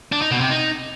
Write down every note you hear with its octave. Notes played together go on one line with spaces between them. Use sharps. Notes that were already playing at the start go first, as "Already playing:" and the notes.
D4
D#4
B2
C3
D#4